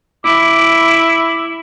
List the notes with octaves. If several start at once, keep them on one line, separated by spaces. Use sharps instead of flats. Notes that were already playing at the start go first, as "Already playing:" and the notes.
E4 D6